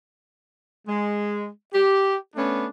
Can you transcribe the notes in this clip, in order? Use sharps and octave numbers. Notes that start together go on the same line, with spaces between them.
G#3
G4
A3 B3 C#4 D4